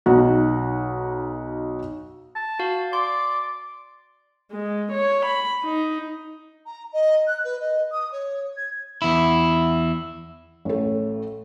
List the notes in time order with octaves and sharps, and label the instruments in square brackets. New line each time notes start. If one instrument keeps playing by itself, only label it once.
[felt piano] B1 D#4 F#4
[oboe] A5
[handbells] F#4 F5
[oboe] D5 [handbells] C6
[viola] G#3
C#5
B5
D#4
[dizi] A#5
D#5
F#6
B4
D#5
D#6
C#5
G#6
[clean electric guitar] E2 E4
[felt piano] A1 A3